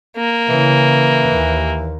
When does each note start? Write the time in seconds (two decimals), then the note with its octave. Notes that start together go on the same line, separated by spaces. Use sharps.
0.17 A#3
0.49 C#3 E3
1.32 D#2